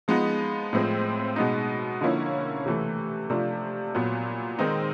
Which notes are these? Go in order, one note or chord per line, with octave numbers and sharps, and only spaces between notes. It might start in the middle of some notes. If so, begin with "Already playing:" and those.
F3 G#3 B3 D#4
A2 F3 G#3 C4
B2 G#3 B3 D#4
D3 F3 A#3 C#4 E4
C3 E3 A3
C3 F3 A3 D4 F4
A#2 F#3 B3
D#3 G#3 C4 D#4